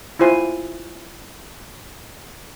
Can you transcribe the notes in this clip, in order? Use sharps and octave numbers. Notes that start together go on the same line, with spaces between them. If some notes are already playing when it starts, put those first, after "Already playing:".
E4 F4 C5 G#5